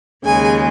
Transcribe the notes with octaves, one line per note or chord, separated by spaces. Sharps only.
D#2 C#3 G#3 G#5